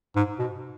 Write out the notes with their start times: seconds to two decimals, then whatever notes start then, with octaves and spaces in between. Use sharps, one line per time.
0.16 G#2
0.39 B2